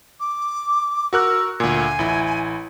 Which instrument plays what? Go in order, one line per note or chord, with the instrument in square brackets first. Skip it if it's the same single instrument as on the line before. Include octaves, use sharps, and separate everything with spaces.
[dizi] D6
[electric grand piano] F#4 A#4 F#6 [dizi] E6
[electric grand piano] D2 A#2 [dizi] G#5
[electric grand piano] A1 E4